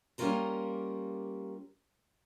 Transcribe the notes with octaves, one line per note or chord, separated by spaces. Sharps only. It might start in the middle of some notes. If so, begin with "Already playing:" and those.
G3 A#3 C#4 F4 A#4 A#5